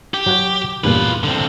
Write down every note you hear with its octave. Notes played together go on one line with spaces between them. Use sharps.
G4
F#3 F#4 C#5
E2 G2 A#2 F4 B4
D3 C4